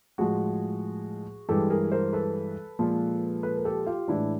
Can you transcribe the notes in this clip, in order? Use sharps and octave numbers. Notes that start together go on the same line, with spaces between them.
A2 F3 G#3 F#4 G#4
G2 E3 G#3 G4 A4
G#4 A#4
A#4 C5
A4 B4
A#2 F3 G#3
A4 B4
A#4
G4 A4
F4 G4
A2 E3 G#3 D4 E4